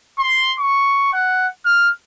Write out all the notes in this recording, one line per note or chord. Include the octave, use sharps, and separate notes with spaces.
C6
C#6
F#5
F6